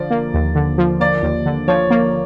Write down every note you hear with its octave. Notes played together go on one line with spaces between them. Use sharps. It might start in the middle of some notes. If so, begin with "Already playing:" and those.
Already playing: D3 F3 D5
A#3
D#2
D3
F3
A#3 D5
D#2
D3
F3 C#5
A#3